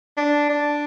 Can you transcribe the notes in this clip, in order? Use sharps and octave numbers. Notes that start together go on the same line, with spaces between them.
D4
D4